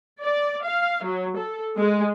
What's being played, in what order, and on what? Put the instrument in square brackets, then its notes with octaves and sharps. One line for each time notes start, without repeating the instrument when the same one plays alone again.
[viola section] D5
F5
F#3
A4
G#3